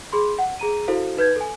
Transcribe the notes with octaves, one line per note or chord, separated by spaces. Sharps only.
G#4 B5 C6
F#5
G#4 A#5 D#7
E4 F#4 A4 C5 F5
D#4 B4 G6 G#6
A4 G#5